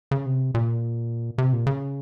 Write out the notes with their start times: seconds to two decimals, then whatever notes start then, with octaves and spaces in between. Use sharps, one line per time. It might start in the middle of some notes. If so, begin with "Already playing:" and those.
0.11 C#3
0.26 C3
0.54 A#2
1.38 C3
1.53 A#2
1.67 C#3